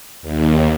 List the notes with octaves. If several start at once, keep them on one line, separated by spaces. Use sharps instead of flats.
D#2